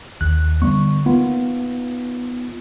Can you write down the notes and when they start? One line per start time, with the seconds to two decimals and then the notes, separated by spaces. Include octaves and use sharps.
0.21 D#2 F#6
0.62 D3 G3 B3 C#6
1.06 A#3 B3 D#4 F4